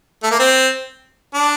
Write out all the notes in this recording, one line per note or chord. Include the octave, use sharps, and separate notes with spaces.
A3
A#3
C4
D4